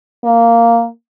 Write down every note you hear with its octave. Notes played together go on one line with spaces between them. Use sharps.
A#3